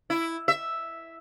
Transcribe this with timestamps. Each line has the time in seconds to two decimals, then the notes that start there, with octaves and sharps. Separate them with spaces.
0.10 E4
0.48 E5